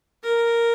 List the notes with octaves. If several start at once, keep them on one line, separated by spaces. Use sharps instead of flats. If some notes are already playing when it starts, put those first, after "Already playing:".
A#4